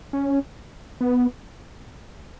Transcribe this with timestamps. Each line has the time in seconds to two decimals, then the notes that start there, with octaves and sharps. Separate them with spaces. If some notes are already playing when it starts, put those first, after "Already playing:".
0.13 C#4
1.01 B3